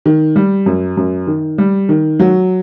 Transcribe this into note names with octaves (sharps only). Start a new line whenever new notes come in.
D#3
G3
F#2
F#2
D#3
G3
D#3
F#3